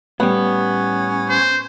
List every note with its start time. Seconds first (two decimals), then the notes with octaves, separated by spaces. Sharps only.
0.20 A2 G3 B3 C#4
1.29 C5